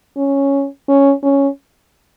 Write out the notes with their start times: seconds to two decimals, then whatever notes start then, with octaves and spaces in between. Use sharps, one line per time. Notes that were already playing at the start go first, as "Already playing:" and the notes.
0.17 C#4
0.88 C#4
1.23 C#4